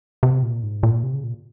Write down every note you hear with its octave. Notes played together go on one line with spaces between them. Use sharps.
C3
A#2
G#2
A#2
C3
C#3
A#2